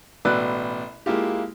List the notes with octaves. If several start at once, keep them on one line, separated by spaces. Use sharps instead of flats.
A1 B2 B4 D5 E6 F#6
G#3 A#3 E4 F4 G4